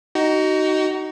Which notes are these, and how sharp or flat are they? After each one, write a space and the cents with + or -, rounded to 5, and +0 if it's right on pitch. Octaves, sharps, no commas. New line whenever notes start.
D#4 +0 F#4 +30